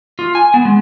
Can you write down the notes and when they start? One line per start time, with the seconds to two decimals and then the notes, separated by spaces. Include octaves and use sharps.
0.19 F4
0.35 G#5
0.54 B3
0.65 G#3